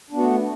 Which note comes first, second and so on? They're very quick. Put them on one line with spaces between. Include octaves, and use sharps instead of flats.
D4 B3 F#4 A3